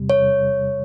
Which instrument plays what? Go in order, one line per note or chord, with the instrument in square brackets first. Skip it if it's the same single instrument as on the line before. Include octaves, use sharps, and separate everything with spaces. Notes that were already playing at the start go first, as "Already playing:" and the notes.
Already playing: [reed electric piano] E2 C3 G3
[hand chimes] C#5